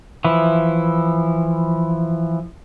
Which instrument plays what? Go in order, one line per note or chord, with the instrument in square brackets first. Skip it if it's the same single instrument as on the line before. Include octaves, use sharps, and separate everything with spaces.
[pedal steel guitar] E3 F3 E4